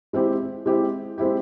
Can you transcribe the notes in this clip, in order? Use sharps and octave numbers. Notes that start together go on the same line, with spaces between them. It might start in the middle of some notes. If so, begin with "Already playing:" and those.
G#3 C4 E4 G4
G#3 C4 E4 G4
G#3 C4 E4 G4